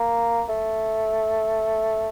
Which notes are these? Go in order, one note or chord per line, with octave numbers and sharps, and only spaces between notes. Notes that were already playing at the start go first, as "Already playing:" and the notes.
Already playing: A#3
A3